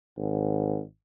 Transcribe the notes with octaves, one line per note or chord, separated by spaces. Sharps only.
G#1